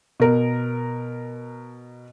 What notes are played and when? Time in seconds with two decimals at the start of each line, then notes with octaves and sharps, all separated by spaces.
0.20 B2 A#4